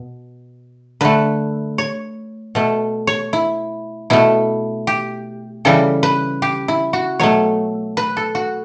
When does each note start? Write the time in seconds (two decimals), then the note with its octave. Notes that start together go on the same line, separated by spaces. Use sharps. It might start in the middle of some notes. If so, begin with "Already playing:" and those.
Already playing: B2
1.01 D3 A3 B4
1.78 C#5
2.55 B2 A3
3.07 C#5
3.33 E4
4.10 B2 A3 E4
4.87 G4
5.65 C#3 E3 G3 A4
6.03 B4
6.42 G4
6.68 E4
6.93 F#4
7.20 B2 F#3 A3 C#5
7.97 B4
8.17 A4
8.35 F#4